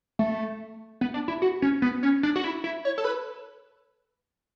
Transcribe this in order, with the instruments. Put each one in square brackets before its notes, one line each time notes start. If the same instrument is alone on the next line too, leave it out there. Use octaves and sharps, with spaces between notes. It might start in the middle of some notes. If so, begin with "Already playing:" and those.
[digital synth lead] A3
B3
D4
E4
F#4
C#4
B3
C#4
D4
F#4
E4
E4
C#5
A4
B4